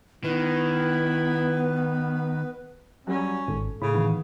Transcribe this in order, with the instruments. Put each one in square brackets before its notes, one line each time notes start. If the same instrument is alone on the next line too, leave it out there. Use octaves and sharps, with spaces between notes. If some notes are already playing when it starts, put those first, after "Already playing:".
[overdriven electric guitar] D#3 [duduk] B3 [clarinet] E4 [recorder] B4
[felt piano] F#2 F#3 G3 [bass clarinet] C#4
[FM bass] G#1 [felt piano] A4
[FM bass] A2 [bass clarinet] C#3 [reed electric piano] B5
[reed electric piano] D#3 E3 [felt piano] B3